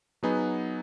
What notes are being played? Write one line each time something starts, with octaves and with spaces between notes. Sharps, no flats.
F#3 B3 D#4 G#4 B4